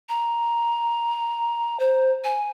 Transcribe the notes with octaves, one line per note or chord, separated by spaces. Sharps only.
A#5
C5
G#5